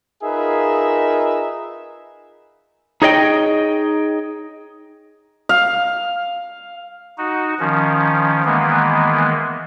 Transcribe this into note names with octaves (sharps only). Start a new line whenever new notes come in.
D#4 F4 G#4 A#4 B4 E5
D#4 G#4 C#5 D#5 F5 G5
F5
D#4 F#4
D#3 F3 C#4
D#3 E3 G#3 A#3 B3